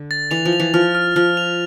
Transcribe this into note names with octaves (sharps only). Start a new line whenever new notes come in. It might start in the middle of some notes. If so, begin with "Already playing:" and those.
Already playing: D3
A6
E3 F7
F3
F7
E3
F3 F6
F6
F3 F6
F7